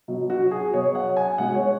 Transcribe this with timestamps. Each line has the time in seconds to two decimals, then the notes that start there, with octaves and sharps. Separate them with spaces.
0.08 B2 F#3
0.30 F#4
0.51 G#4
0.73 B2 F#3 C#5
0.95 F#5
1.17 G#5
1.38 B2 G#3 F#5
1.55 C#5